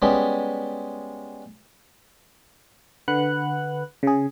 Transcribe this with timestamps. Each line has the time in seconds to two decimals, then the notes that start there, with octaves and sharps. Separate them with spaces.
0.02 G3 G#3 B3 C#4 G4
3.08 D3 B4 F#5 F#6
4.03 C#3 G#4